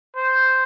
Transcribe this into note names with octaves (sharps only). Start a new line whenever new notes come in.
C5